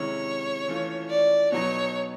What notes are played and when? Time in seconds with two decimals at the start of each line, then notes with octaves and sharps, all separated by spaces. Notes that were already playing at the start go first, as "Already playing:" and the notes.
Already playing: C3 D#3 G#3 C#4 E4 C#5
0.68 E3 A3 C#4 F4
1.10 D5
1.52 B2 F#3 B3 D#4 C#5